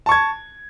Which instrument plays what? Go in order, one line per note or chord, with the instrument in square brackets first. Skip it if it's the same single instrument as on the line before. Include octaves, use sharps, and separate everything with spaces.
[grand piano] A5
C#6
G#6